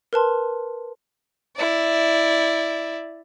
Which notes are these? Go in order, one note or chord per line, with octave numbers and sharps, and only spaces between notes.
A#4 B4 A5 C6
E4 D5